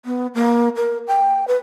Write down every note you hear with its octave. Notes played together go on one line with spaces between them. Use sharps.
B3
A#3
A#4
G5
B4